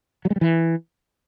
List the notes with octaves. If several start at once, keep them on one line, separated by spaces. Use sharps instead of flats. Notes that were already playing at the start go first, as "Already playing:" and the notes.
F#3
G#3
G3
E3